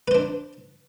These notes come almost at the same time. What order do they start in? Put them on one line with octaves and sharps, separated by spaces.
B4 C5 D4